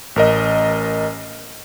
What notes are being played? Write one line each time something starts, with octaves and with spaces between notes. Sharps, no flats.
A1 A#4 D#5